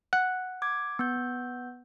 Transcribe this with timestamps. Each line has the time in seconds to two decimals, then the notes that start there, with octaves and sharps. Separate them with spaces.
0.13 F#5
0.62 D6 G#6
0.99 B3 G6